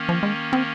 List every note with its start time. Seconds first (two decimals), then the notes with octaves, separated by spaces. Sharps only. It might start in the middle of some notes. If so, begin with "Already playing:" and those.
Already playing: D#3 A#3 C#4
0.09 F3
0.23 G#3
0.53 C4